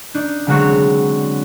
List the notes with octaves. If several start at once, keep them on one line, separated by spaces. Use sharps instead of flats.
D4 D#4
D3 F#3 G#3 C4 F#4 C#5